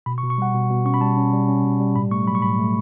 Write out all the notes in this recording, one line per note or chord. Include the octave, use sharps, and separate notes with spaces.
B2 B5
C#6
B2
C#6
G3 F#5
B2
B2
C#4 C#6
B5
G3 A5
C#4
G3
C#4
B2
G3
A2 B5
A3 C#6
F#3 B5
C#6
A2 B5
A3